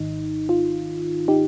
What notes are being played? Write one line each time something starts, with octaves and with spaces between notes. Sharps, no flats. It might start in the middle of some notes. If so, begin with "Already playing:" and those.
Already playing: G#1 G#2 D#3 D#4
F4
D#4 G4